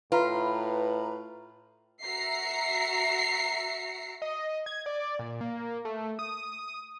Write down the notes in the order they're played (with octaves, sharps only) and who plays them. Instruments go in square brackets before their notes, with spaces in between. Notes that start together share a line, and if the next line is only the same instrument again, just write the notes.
[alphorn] A2 [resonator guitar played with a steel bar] F4 [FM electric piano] B4 A#5 B5
[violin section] F#4 E5 A#5 C7 C#7
[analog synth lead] D#5
D#5
G#6
D5
A#2
A#3
A3
D#6